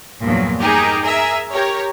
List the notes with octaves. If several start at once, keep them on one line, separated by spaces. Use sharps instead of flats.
E2 G2 A#2 F3 F#3
D#4 G4 G#4 A#4
G#4 A#4 E5
G4 A#4 C#5